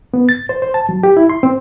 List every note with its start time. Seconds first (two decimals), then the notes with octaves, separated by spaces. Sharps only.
0.14 B3
0.29 A6
0.49 C5
0.62 C5
0.74 A5
0.89 F#3
1.03 G4
1.17 E4
1.29 C6
1.43 C4